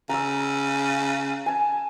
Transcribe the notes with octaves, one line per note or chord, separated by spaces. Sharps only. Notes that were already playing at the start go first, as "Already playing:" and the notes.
C#3 A#5 E6
G#5 A5